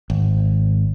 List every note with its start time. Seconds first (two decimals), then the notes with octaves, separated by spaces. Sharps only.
0.10 G#1